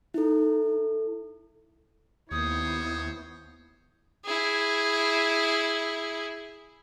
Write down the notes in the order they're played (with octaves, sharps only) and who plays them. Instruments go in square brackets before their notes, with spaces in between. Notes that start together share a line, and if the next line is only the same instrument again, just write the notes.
[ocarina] D#4 [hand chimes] E4 A4
[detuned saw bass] D#2 [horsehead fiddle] B3 E4 [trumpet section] C5 C#5 [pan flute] D#6
[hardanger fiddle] E4 G#4